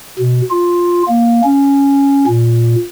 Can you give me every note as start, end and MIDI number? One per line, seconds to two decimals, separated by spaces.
0.19 0.42 47
0.51 1.03 65
1.08 1.41 58
1.44 2.26 61
2.27 2.75 46